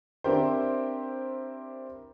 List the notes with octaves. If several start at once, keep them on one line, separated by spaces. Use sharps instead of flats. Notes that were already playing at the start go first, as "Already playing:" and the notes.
C4 D4 E4 G4 A#4 C5